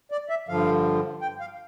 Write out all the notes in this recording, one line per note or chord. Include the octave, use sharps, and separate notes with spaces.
D5
E5
G2 D3 F3 F5
G5
F5